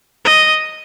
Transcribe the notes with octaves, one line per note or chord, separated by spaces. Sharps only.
D#5